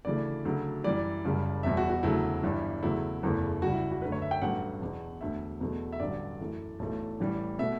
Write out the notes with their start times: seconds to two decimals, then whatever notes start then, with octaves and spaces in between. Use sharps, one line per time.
0.05 D2 C#3 E3 A3 D5
0.45 D2 C#3 F#3 A3
0.84 F#2 E3 G3 D5
1.25 F#1 F#2 C#3 G3
1.63 E1 E2 B2 G3 E5
1.77 F#4
1.90 F#4
2.03 E1 D2 C#3 F#3 A3 E4
2.43 G1 G2 E3 G3
2.83 E2 C#3 F#3 A3 E4
3.22 F#1 E2 C#3 E3 A3
3.62 C#2 C#3 G3 F#4
3.72 E4
3.92 F#4
4.02 F#2 D3 A3 B4
4.12 C#5
4.22 E5
4.31 G5
4.42 A1 G2 F#3 A3 F#5
4.81 E2 B2 F#3
5.21 E1 D2 D3 E5
5.61 E2 B2 F#3 A3
5.92 E5
6.00 A1 G2 D3 F#3 D5
6.39 F#2 E3 A3
6.79 B1 A2 E3 A3
7.20 A1 A2 E3 G3
7.59 B2 A3 E5